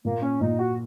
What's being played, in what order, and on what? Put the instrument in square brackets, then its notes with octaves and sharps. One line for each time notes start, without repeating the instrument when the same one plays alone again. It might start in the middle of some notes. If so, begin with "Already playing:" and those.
[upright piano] A#2 [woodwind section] A#3
[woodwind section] C#4
[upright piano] A#2 [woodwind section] D#4
[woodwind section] F#4